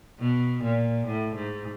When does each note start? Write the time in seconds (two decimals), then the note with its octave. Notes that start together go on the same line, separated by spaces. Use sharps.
0.19 B2
0.63 A#2
1.06 A2
1.35 G#2